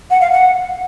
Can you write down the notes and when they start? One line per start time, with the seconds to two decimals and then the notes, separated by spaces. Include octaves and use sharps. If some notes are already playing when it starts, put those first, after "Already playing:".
0.10 F#5
0.21 F5
0.31 F#5